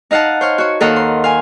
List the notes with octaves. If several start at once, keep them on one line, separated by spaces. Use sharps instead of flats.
D#4 D#5 F5 F#5 A5
C5 C#5 F6
F#4 C#5
D#2 A4 A#4 D#5 F5 F#5
C6
F5 G#5